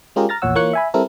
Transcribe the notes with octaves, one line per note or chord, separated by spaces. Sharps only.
G#3 C#4 F4 G4 G#4 A#4
A#5 F6 A6 A#6
A#1 E2 A#2 C#5 F#5 E6
E3 A#3 F4 C#5 F#6 C#7
E5 G#5 B5
G3 C4 E4 A4 A#4